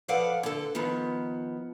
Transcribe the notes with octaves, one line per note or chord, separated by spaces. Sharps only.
F3 A4 B4 D5 F5 F#5
D3 A4
D#3 F3 B3